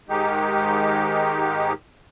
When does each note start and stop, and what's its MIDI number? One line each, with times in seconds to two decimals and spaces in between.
0.09 1.73 44
0.09 1.73 51
0.09 1.73 56
0.09 1.73 63
0.09 1.73 67